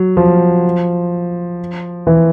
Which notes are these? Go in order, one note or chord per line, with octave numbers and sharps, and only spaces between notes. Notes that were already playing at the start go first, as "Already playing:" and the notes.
Already playing: F#3
F3
E3